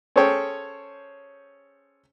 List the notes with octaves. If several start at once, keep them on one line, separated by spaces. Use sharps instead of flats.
C#4 G#4 A4 C5 C#5 G5